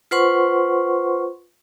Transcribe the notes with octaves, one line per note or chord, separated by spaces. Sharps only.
F4 B4 C5 F#5 C6 C#6